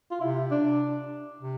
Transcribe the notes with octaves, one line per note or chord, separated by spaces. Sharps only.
F4
C3 E4
D4
C3